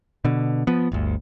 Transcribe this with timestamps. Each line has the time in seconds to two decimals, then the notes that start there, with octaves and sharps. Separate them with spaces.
0.25 B2 D3
0.67 F3 B3
0.92 G1 D2